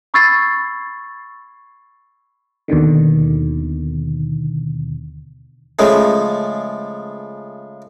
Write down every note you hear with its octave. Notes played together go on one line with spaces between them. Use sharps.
B5 C#6 E6 G#6 A6 C7
D#2 B2 D3 D#3
C#3 F3 G#3 A3